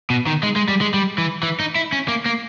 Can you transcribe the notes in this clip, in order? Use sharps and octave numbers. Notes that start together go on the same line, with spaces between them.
B2
D#3
G#3
G#3
G3
G#3
G3
E3
E3
D#4
E4
C#4
A#3
A#3